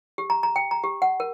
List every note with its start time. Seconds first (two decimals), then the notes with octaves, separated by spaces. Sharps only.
0.18 G4
0.30 A#5
0.43 A#5
0.56 G5
0.71 A#5
0.84 G4
1.02 F#5
1.20 A#4